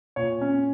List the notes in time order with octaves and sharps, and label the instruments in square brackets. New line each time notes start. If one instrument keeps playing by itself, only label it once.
[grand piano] A#2 C#5
C#4